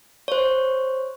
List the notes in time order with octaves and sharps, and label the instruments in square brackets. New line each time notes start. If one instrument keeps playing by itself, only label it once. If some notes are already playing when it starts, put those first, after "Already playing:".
[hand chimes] C5 C#5